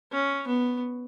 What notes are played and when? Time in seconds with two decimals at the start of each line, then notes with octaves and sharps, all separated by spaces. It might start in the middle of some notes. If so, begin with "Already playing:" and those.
0.12 C#4
0.48 B3